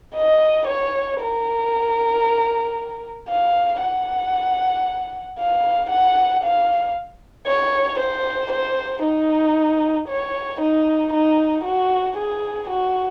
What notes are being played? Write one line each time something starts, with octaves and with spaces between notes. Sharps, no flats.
D#5
C#5
A#4
F5
F#5
F5
F#5
F5
C#5
C5
C5
D#4
C#5
D#4
D#4
F#4
G#4
F#4